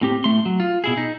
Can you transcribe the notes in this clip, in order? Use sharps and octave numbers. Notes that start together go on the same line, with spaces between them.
A2 C4 G4
A2 A3 C6
F#3
F4
B2 E4 G#4
D#4